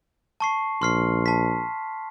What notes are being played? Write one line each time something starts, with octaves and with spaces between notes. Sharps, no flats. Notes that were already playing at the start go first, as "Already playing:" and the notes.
A5 C#6 C7
A#1 C6 F6 C7
A5 B6